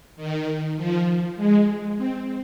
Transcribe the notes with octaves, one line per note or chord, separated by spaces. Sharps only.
D#3
F3
G#3
C4